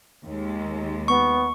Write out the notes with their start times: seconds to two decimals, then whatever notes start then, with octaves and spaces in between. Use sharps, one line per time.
0.25 D#2 G#3
1.08 B3 C#6